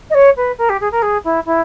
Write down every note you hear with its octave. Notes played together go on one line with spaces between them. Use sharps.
D#5
C#5
B4
A#4
G4
G#4
A#4
G#4
E4
E4